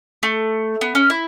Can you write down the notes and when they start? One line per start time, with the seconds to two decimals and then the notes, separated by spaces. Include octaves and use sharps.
0.23 A3
0.81 B3
0.95 C#4
1.10 E4